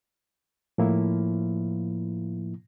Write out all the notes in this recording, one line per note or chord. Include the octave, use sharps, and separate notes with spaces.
A2 F3 A#3 E4